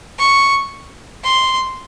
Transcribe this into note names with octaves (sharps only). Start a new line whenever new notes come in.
C#6
C6